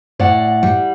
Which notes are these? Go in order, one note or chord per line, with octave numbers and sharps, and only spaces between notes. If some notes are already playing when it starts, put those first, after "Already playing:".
A2 D5 F#5
G3